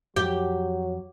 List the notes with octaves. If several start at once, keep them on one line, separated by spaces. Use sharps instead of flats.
F2 F#3 G4